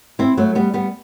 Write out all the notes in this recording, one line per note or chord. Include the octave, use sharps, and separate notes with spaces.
C4 E4
F#3 A3
G3 B3
G3 B3